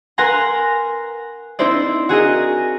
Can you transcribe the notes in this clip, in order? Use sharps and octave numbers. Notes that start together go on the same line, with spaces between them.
A#4 B4 F#5 G#5 A#5 C6
C4 D#4 E4 C5 D5
F#4 G#4 A#4 D#5